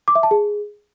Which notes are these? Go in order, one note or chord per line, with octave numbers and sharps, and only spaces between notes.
D6
E5
A5
G#4